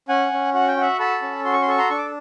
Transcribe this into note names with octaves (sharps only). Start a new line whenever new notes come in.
C#4 F#5 G#5
C#4
F#4 F#5
G5
F#4 E5 F#5
A4 A5 B5
C#4
F#4 C6
C#6
C6
A4 C#6
A#5 C6
D4 C#6
D6